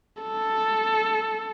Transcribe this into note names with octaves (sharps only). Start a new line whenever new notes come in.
A4